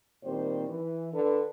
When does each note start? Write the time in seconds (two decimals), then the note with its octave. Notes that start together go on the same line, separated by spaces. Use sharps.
0.23 A#2 D#3 G3 C4 C5
0.69 E3
1.12 D3 D4 A4 B4